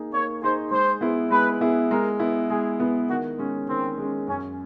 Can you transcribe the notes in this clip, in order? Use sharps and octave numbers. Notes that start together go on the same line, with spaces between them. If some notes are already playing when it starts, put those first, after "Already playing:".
Already playing: A#3 D#4 G#4
A#3 C#5
D#4 G#4 C5
G#3 C5
B3 E4 G#4
G#3 B4
B3 E4 G#4
G#3 A#4
B3 E4
G#3 G#4
B3 E4
D#3 F#4
G#3 C#4
D#3 C4
G#3
C#4
F#2 C#4